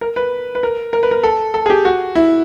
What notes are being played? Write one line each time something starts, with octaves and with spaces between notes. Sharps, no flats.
A#4
B4
B4
A#4
A#4
B4
A#4
A4
A4
G#4
G4
F#4
E4